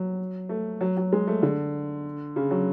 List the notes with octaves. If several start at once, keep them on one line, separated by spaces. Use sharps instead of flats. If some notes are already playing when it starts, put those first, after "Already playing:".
Already playing: F#3
A3
F#3
F#3
G#3
A3
D3
C#3
F#3